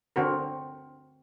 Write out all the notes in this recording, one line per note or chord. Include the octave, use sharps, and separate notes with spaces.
D3 C4 F#4 A#4